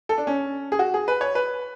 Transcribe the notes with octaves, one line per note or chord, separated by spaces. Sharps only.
A4
D4
C#4
G#4
F#4
G#4
B4
C#5
B4